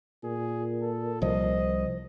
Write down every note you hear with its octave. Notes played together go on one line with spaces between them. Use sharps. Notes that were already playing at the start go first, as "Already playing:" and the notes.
A#2 G#4
A4
C2 F3 D#5